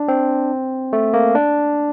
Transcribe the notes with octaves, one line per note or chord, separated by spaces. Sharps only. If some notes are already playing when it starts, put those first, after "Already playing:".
Already playing: D4
C4
A3
A#3
D4